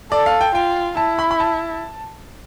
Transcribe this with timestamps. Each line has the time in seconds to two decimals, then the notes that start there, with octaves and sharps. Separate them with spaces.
0.12 A4 D5
0.26 F5
0.41 G5
0.55 F4 G5
0.97 E4 A5
1.19 B5
1.31 B5
1.40 A5